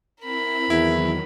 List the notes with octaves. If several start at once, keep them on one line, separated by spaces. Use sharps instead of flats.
C4 E4 A#4 B5
E2 D#3 F#3 E4